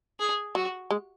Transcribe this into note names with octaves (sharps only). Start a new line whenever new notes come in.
G#4
F#3 F#4
G#3